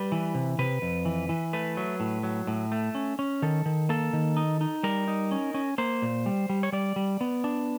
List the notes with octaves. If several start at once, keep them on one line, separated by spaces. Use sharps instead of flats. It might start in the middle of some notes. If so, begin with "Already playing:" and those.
Already playing: G3 B4
E3
C3
C3 B4
F2
E3
E3
A3 B4
F#3
A2
F#3
A2
A3
C#4
C#4
D#3 A4
D#3
A#3 A4
D#3
D#4
D#4
G3 A#4
D#4
C#4
C#4
A#3 C5
A#2
G3
G3
C#5
G3 D5
G3
B3
D4